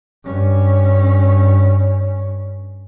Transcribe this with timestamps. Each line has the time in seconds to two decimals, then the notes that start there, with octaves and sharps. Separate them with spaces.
0.24 G2 C#4